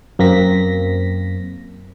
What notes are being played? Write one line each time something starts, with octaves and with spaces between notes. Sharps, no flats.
F#2 A#3 C4 A#6 B6